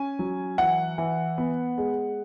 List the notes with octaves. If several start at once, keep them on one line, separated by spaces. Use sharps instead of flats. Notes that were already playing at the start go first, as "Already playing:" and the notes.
Already playing: C#4 G#5
F#3
E3 F#5
E3
B3
G#3